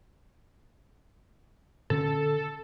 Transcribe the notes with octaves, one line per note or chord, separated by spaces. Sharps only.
A#2 D3 C#4 A4